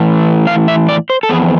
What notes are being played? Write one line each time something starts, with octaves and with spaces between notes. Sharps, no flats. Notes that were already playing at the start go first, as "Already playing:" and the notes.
Already playing: A2 E3 A3 E4
F5
E5
D5
C5
A4
F2 E3 B3 G#4